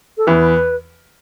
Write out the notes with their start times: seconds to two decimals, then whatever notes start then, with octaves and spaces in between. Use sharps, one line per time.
0.18 A4
0.27 E2 E3 B4